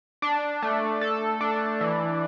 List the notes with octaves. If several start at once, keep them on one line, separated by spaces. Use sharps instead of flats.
D4
A3
A4
D4
E3